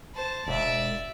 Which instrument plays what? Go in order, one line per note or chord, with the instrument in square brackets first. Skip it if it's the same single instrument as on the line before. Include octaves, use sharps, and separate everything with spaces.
[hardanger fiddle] C5 A5
[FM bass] E1 [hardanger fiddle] D5 E5